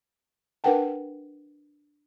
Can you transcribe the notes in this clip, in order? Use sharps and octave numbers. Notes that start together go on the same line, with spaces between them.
D4 A#4 B4 F#5 G5 A5